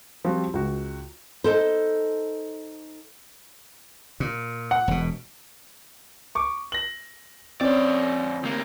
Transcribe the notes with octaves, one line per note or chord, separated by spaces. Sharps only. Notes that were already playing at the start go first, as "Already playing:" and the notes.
F3 G3 C4 F#4
C#2 F#4
D#4 A4 C5
A#2
F#5
E1 B2
C#6 D6
A#6 F#7
F2 C4 C#4 D5
D2 A#3